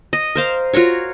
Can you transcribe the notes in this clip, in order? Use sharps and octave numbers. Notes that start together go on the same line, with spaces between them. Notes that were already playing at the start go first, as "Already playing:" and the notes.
D#5
A#4 C5 F5
F4 F#4 A#4 C#5